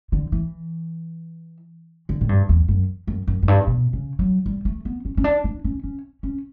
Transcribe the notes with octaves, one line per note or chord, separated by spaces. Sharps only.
D3
E3
D3
A2
G2
E2
F#2
F#2
F#2
F#2
G2
B2
C#3
F#3
G3
A3
B3
C#4
C#4
D4
D4
C#4
C#4
C#4